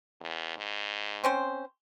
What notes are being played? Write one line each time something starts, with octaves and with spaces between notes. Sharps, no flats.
E2
G#2
C4 C#4 C5